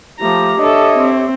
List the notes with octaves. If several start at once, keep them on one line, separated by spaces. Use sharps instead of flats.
F3 A3 G4 A#5
D4 A4 C#5 D#5 E5
C4